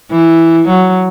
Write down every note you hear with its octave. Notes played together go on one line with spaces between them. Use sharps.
E3
F#3